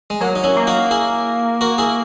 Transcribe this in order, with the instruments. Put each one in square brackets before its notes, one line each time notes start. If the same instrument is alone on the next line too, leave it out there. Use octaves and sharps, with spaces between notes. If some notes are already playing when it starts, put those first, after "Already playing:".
[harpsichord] G#3
[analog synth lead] F#3 [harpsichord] A#3
[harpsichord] D#4
C#4 E4
[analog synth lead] A#3
[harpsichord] D#4 F#4
E4 G#4
F#4 A#4
E4 G#4